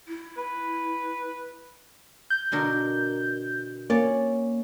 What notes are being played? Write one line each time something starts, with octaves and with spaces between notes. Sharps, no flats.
E4
B4
G6
B2 D3 A#4
A#3 C#4 D5